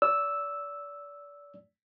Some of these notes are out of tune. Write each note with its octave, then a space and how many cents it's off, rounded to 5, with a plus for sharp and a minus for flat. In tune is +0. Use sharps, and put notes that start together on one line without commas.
D5 -30 E6 -5